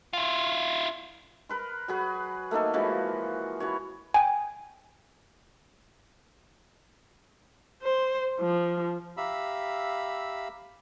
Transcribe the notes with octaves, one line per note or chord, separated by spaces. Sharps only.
E4 F4
A#4 B4 C6
F#3 F#4 G#4 B4
A3 A#3 D#4 A4
E3 F3 G#3 F#4
E3 F#4 C#5
G5 G#5
C5
F3
G4 E5 F5 A#5 B5 E6